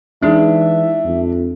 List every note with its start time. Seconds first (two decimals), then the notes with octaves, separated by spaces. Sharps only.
0.22 E3 G#3 D4 D#4 G#4 E5
1.05 F2